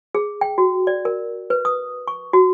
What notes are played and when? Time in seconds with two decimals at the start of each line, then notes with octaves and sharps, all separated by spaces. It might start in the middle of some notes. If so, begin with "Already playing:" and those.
0.15 G#4
0.41 G5
0.58 F#4
0.87 D5
1.05 A#4
1.50 B4
1.65 D#6
2.08 C#6
2.33 F#4